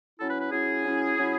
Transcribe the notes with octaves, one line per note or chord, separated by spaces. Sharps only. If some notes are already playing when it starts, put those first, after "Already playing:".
F#3 C#4 E4 A4
B4
B4
F#3 C#4 E4 G#4
F#3 C#4 E4
F#3 C#4 E4